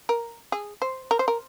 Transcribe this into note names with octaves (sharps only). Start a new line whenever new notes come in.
A#4
G#4
C5
A#4
C5
A#4